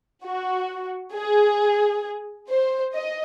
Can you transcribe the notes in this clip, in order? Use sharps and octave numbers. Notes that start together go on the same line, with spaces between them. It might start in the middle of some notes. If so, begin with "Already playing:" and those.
F#4
G#4
C5
D#5